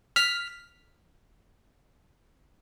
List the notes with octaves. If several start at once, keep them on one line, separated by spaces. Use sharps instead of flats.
F6 B6